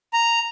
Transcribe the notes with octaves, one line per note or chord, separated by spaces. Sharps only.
A#5